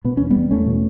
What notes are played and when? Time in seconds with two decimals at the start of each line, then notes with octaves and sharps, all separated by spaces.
0.04 B2 B3
0.17 E2 C#4
0.30 G3 B3
0.36 E2
0.51 E2 A3 C#4
0.66 B2